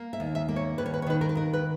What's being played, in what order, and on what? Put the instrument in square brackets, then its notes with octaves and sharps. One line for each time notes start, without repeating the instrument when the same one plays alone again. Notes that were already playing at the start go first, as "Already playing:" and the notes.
Already playing: [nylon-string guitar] A#3
E5
D#2
E5
A#3
C#5
D#2 B4
C#5
B4
C#5
D#3 B4
A#4
B4
D#2 A#4
B4